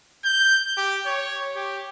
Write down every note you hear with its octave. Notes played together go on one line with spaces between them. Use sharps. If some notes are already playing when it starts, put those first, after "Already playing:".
G6
G4
C#5
G4